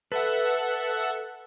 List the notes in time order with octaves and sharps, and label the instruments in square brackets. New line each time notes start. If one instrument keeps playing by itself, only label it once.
[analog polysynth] A4 E5 F#5 [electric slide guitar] B4